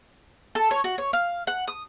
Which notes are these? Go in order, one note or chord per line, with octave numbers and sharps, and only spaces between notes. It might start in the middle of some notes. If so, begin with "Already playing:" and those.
A4
C#5
F#4
C#5
F5
F#5
D#6